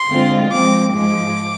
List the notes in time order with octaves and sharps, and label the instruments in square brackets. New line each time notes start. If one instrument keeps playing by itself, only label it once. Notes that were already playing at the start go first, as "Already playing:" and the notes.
Already playing: [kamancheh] C6
[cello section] D3 G#3 C4 F4
[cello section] F3 G#3 C4 [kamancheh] D6
[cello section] G#2 F3 G#3 [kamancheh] D6